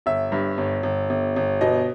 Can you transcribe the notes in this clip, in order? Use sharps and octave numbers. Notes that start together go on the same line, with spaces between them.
G1 E5
G2
G1
G1
G1
G1
B2 D#5